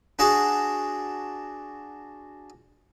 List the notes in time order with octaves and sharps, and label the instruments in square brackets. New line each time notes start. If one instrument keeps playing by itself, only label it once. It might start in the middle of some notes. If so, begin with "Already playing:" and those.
[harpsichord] D4 F#4 G#4 A5 D6